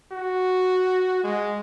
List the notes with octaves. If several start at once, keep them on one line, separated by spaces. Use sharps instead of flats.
F#4
G#3